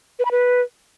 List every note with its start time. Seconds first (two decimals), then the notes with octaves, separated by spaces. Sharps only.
0.19 B4
0.25 B5
0.31 B4